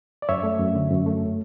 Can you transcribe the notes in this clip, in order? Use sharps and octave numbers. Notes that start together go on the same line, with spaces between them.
D5
F#2 C#5 E5
A3
F#2
D3
F#2
A3